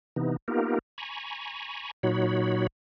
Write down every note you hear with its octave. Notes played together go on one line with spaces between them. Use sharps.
C3 E3 B3 D#4
A#3 B3 D#4 F4 G4 A#4
G#5 A#5 B5 C#6
A#2 F#3 D#4 F#4 C#5 B5